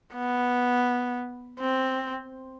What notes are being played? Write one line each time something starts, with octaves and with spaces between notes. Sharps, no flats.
B3
C4